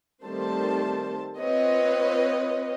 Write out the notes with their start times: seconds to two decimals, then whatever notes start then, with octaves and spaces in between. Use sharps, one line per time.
0.24 D#3 G3 A3 C4 C5 A5
1.38 C4 F4 B4 C#5 D#5